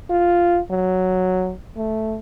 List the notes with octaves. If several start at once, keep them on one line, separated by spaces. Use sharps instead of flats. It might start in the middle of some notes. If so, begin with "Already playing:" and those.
F4
F#3
A3